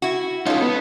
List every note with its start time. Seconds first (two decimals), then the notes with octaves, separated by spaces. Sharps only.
0.02 E4 F#4
0.46 C#4 D#4 F4 A4
0.62 B3